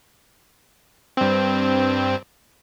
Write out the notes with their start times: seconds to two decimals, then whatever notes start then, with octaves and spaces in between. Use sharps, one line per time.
1.17 G2 C4